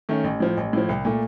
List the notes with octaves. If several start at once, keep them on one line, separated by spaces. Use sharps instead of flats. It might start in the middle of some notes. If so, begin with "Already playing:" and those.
D#3 A3 C#4
A1
A2 F3
A1
A2 F3
C2
A#2 A3